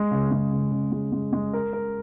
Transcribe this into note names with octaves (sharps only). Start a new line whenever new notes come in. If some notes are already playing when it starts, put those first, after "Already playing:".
Already playing: G#3
C#3
G#3
C#3
C#3
G#3
G#3
G#3
A#4
A#4